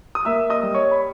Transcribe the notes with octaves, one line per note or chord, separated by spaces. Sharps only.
D#6
A#3 E5 E6
D#5 D#6
G3
C#5 C#6
B5